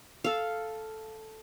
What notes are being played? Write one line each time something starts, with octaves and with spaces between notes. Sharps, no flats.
A4 F5